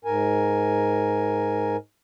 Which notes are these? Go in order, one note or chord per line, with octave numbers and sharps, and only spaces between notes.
G#2 A#4 G#5